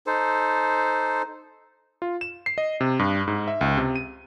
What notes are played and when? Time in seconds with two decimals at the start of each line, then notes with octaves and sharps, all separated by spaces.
0.07 D#4 A4 C5
2.02 F4
2.21 E7
2.46 C7
2.58 D#5
2.80 C3
2.99 G2
3.27 G#2
3.48 E5
3.61 C#2
3.77 C3
3.96 D#7